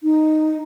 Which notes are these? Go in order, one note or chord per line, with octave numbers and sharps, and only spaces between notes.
D#4